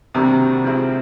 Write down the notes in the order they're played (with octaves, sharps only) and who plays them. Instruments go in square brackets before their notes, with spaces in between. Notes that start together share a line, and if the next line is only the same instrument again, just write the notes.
[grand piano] C3 [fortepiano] D#3 G3 A#3 D4 F#4
[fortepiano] F3 G#3 C4 E4